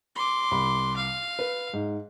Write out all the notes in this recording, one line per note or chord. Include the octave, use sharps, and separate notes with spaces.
C6 D6
C2 B5
F5
B4
G#2